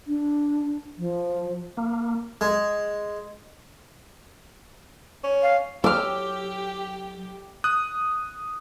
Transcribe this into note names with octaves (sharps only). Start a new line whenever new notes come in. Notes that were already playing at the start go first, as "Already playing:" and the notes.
D4
F3
A#3
G#3
C#4
F5
F#3 G4 D6 E6 F6
D#6 F#6